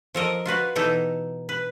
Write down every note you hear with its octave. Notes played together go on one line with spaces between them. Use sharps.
F3 A4 A#4 D#5
F4 F#4 B4 F5
B2 E3 D#4 A4
B4